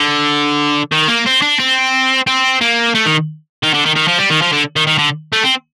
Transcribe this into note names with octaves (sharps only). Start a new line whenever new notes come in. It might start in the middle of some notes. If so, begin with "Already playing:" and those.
Already playing: D3
D#3
A#3
C4
D4
C4
C4
A#3
A3
D#3
D#3
D3
D#3
D#3
F3
G3
D#3
F3
D3
D#3
D#3
D3
A3
C4